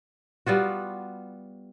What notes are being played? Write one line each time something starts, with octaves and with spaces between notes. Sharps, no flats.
G3 B3 F4 F#4